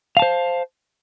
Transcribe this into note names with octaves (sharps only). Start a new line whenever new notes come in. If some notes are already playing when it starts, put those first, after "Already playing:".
C5 F5 A5